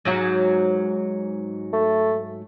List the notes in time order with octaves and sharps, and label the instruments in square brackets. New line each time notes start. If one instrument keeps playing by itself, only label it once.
[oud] G#2 F#3 F#4
[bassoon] A3